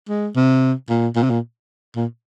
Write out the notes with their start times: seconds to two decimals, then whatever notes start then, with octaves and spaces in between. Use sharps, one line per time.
0.09 G#3
0.35 C3
0.89 A#2
1.16 A#2
1.23 C3
1.30 A#2
1.96 A#2